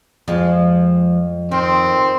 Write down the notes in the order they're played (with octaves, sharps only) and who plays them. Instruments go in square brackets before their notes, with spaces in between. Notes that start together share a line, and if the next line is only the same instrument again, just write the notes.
[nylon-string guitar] F2 [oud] F3 G#3
[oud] D#3 [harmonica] C4